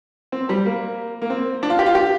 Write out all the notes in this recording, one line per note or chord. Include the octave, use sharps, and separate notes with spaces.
C4
G3
A#3
A#3
C4
D4
F4
G4
F4
G4